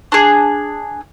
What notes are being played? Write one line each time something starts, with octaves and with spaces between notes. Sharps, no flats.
D4 G#4